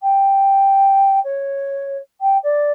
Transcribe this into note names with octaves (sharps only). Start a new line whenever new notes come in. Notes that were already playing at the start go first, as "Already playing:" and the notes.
G5
C#5
G5
D5